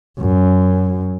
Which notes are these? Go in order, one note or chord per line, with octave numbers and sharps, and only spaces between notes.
F#2